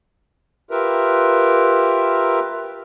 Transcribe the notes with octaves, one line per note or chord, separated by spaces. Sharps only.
F4 G4 A#4 B4 E5